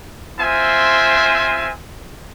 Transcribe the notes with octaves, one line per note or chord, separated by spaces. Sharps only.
C4 F4 C5 E5 G#5